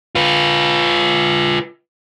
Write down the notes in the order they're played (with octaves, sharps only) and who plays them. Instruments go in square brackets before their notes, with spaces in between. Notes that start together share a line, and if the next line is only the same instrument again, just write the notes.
[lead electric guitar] F4 B4